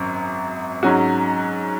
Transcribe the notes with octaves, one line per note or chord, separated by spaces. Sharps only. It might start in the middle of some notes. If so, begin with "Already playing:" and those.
Already playing: G#1 F#2 F#3
G#2 F#3 C#4 F#4